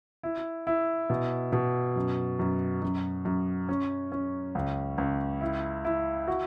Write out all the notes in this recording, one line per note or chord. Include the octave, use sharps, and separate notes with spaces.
E4
E4
B2
B2
F#2
F#2
F#2
F#2
C#4
C#4
C#2
C#2
E4
E4
F#4